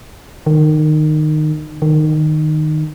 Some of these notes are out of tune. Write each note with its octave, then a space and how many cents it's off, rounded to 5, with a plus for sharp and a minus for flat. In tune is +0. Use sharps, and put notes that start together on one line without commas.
D#3 -20
D#3 -15